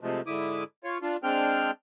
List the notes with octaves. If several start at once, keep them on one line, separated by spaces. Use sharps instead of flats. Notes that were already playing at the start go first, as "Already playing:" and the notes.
C3 F3 G#3 A3
G#2 D3 E4 D6 D#6
F4 C#5
D4 F4
G#3 C4 D4 G5 F6